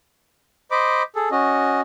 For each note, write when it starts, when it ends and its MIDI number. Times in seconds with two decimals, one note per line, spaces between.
0.71 1.03 72
0.71 1.03 75
0.71 1.03 83
0.71 1.03 86
1.16 1.29 68
1.16 1.29 69
1.31 1.81 61
1.31 1.81 66
1.31 1.81 75